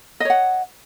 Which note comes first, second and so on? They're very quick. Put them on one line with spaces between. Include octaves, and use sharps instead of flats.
D#5 C#5 F#5